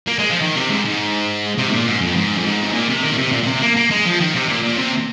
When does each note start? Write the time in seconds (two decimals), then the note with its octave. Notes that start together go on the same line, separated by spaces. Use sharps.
0.07 A#3
0.19 G#3
0.30 F3
0.42 D#3
0.56 C3
0.70 G#2
0.85 G#2
1.58 C3
1.68 G#2
1.72 A#2
1.87 G#2
2.01 F2
2.16 G#2
2.37 F2
2.46 G#2
2.63 C3
2.74 A#2
2.89 C3
3.03 D#3
3.12 A#2
3.18 C3
3.32 A#2
3.43 A#2
3.47 C3
3.61 A#3
3.76 A#3
3.90 G#3
4.06 F3
4.20 D#3
4.35 C3
4.49 A#2
4.63 A#2
4.78 C3